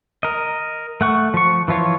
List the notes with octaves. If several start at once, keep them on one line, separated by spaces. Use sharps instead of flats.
A#4 D#5
A3 F#5 C#6
F3 C#6
E3 F3 F4 C#5